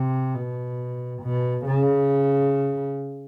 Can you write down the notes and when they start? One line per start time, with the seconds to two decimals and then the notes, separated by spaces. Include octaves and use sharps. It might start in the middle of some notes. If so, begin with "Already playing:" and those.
Already playing: C3
0.34 B2
1.22 B2
1.66 C#3